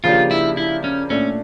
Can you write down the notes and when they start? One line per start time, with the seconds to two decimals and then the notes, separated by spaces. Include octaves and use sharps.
0.04 C#3 F3 A#3 D4 F4 G4
0.31 E4
0.57 E4
0.84 C#4
1.10 A#2 A3 C#4 D4